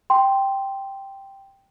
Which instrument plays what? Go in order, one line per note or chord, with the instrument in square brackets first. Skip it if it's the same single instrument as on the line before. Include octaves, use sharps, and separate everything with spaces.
[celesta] G5 C6